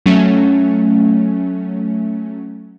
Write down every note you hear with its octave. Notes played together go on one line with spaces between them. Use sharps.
F#3 A3 C#4